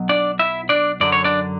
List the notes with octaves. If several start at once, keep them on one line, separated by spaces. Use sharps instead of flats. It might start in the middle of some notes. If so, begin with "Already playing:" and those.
Already playing: B1 B2 F#3
D4 D5
E4 E5
D4 D5
F#2 D3 F#3 D5
C#5
D4 D5